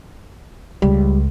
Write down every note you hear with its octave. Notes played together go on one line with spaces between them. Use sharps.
C#2 G3